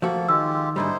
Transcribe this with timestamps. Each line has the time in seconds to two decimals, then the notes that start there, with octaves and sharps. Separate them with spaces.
0.02 F3 A3 A#3 F#4 A4
0.29 D#3 G#3 F4 G4 E6
0.76 G#2 D3 G3 D#4 E4 C5